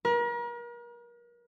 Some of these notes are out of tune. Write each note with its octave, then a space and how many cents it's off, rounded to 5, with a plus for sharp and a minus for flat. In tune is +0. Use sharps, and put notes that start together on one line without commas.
A#4 +40